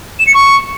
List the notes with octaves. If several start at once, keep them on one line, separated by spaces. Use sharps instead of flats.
E7
C#7
C#6